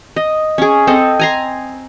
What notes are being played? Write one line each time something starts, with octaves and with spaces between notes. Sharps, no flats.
D#5
C#4 G#4
C4 A4 D#5
G#5 A#5 C6